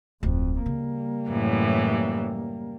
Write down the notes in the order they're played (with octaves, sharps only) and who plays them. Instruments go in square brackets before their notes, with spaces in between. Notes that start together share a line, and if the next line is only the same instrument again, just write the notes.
[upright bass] D1 [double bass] F2
[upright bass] C#3 [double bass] G3 A#3
[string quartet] F#2 A2 E3